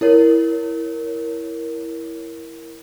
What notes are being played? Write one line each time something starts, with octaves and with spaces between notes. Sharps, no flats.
E4 A#4 C#5